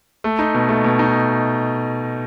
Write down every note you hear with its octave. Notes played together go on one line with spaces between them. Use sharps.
A3
D#4
B2
A3
B2
D#4